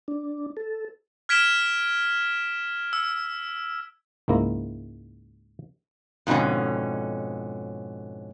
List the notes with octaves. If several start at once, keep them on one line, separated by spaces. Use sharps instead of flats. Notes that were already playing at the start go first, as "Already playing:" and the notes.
D4
A4
F6 G#6 B6 D7 E7 G7
E6
C#2 G#2 A#3 E4 A#5
F2 G#2 B2 D3 C#4